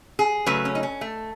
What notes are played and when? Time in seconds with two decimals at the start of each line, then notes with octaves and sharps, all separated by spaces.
0.19 G#4
0.46 C#3 F#3 A3 B4
0.65 C#4
0.75 D#4
0.83 C#4
1.01 A3